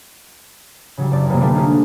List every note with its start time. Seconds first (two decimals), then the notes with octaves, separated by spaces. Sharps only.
0.97 C#3 F#3 G3
1.12 F#1 D5
1.29 C3 F#3 G#3 A#3 B3
1.40 D3 G3 A3 A#3 F4
1.55 G3 G#3 A#3 D4 D#4
1.71 D5